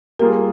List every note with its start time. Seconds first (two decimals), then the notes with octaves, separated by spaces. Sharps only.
0.19 G3 A#3 F4 G#4 A#4